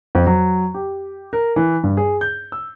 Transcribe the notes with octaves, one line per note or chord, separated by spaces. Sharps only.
F2
F#3
G4
A#4
E3
G2
G#4
G6
E6